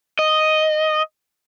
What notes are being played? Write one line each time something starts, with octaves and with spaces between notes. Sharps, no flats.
D#5